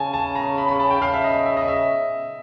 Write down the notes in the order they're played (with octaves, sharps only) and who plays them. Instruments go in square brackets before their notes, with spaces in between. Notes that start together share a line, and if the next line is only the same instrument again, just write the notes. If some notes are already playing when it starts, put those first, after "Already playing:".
Already playing: [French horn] C#3 [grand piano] G#5 A5
[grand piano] A5
A#5
B5
B5
A5
G5
[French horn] C#3 [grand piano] F5
[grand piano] E5
D#5
E5
D#5
E5